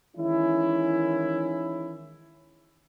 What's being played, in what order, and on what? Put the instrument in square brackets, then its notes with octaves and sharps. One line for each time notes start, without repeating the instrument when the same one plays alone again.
[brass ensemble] D#3 E3 G#3 C#4 E4